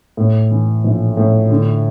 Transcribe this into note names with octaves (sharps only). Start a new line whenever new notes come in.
A2
E3
A#1
A2
D3